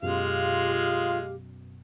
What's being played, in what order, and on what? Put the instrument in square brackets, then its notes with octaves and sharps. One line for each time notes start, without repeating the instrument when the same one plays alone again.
[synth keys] F#2 B2 [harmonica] G#3 F5 [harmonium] F4 [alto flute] G4